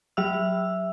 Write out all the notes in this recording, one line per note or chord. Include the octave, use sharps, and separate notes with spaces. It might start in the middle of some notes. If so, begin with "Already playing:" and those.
F#3 E5 E6